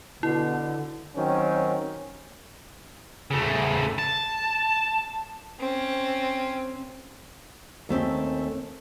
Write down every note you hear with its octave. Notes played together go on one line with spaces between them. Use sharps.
B2 D3 E4
D#3 F#3 C4 C#4
C#3 A3
A5
C4 C#4
D#2 A3 C4 C#4